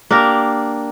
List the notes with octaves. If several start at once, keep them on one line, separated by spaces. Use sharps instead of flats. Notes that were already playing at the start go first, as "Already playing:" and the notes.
A#3 D4 G4 A#4